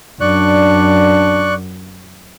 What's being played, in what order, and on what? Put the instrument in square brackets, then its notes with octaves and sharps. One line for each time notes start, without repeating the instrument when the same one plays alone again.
[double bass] F#2 [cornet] D4 [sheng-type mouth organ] D5 C#6 F#6